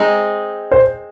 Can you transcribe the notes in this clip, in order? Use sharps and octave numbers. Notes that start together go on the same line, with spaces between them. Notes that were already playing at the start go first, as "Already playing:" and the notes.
Already playing: G#3 C4 D#4
C5